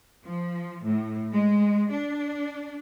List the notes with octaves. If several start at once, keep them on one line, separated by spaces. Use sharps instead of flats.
F3
A2
G#3
D4